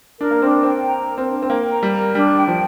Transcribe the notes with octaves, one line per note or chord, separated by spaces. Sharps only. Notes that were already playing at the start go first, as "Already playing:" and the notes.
D4 A#4
A#3
C4 D4
C4 G5
A#5
A#4
C4
D4
C4
A#3 G5
A#5
G3
A#4
G3 D4
G5
F3